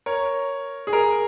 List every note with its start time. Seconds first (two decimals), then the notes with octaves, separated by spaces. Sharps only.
0.06 A#4 C#5
0.87 G#4
0.93 A#4